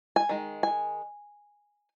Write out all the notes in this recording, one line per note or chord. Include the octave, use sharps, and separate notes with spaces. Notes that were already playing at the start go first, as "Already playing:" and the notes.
G#5
D#3 G#3
G#5